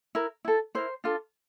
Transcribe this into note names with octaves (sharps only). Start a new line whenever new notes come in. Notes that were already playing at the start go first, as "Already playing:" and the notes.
E4 A#4
E4 A4
E4 A#4 C5
D4 F4 A4